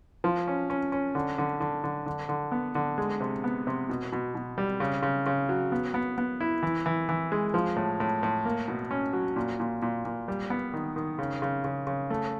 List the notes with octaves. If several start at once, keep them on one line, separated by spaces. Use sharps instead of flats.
F3
C#4
C#4
C#4
D3
D3
D3
D3
D3
D3
B3
D3
G#3
C3
B3
C3
B2
B2
B2
G3
C#3
C#3
C#3
F#3
B3
B3
B3
E4
E3
E3
E3
G#3
F3
A2
A2
A2
A#3
B2
C#4
F#3
A#2
A#2
A#2
A#2
G3
B3
D#3
D#3
C#3
C#3
C#3
C#3
A3